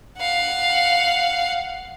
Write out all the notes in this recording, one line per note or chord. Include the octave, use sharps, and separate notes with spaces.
F5 F#5